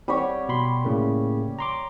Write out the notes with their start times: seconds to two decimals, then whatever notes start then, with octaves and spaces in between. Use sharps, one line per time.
0.08 G3 C4 G4 C#5
0.49 B2 B5 C6
0.85 A2 C#3 A#3
1.59 A#5 C6 D6